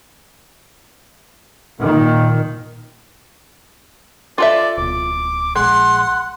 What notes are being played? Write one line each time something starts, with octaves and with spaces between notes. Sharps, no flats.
A#2 D#3
F4 A4 D5 E5
D1 B2 D6
A#1 G#3 F#5 C6